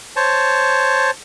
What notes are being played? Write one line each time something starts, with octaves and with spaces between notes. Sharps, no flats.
C5 C#5 A5